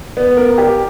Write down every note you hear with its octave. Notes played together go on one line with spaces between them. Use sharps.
B3
A#4
G4